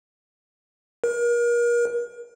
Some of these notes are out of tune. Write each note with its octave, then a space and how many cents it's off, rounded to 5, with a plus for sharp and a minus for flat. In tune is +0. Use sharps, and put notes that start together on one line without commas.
A#4 +35